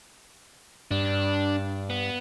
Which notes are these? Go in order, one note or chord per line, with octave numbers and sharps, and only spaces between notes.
G2 D4
B3